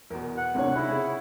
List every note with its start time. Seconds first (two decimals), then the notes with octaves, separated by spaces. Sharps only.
0.10 E2 B2 A#4
0.37 F#5
0.55 C#2 A2 C3 D4 C#5
0.76 C#3 D#4 E4 B5
0.88 C#4 G#4